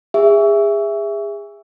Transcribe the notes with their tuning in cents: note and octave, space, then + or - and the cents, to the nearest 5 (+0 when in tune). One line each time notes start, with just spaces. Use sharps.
G#4 -25 E5 +5